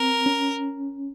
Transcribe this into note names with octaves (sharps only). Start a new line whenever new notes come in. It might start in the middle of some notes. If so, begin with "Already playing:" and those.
Already playing: C4 A#4
C#4